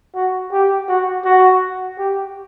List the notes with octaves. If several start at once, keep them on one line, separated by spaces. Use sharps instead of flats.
F#4
G4
F#4
F#4
G4